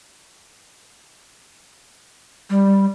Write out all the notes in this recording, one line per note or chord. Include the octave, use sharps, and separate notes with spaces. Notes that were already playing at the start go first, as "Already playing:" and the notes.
G3